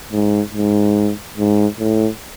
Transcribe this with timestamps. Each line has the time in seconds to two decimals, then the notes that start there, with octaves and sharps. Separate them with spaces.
0.12 G#2
0.54 G#2
1.38 G#2
1.79 A2